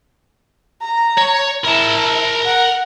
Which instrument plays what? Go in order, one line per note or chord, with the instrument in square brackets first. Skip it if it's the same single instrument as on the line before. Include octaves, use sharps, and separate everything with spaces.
[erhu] A#5
[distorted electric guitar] C#5
[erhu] E4 [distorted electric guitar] A#4 A5
[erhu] F#5